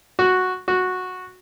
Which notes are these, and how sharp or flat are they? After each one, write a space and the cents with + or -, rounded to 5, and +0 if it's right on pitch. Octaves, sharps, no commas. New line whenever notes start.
F#4 -5
F#4 -10